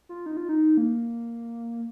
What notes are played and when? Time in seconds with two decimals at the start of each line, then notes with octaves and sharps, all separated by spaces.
0.09 F4
0.26 D#4
0.37 F4
0.49 D#4
0.77 A#3